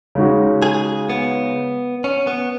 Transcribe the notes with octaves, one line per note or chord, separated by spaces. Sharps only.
C#3 G#3 D#4 F#4
G#4
B3
C#4
B3